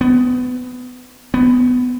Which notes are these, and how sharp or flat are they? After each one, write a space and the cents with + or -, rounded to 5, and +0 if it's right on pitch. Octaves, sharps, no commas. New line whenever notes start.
B3 +20
B3 +15